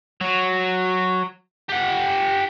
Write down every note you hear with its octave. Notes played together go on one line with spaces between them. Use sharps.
F#3
G4 F#5